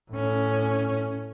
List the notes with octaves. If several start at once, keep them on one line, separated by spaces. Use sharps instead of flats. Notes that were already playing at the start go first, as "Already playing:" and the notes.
A2 C#4